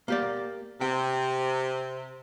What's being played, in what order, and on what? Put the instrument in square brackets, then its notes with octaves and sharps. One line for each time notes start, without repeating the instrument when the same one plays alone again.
[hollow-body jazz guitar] A#3 G4 D5
[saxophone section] C3 [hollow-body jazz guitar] G5